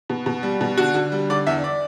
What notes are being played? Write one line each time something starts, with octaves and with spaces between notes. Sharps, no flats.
B2
B2
G3
B2
D3 F#4
D3
G3
D3 D5
E2 E5
D5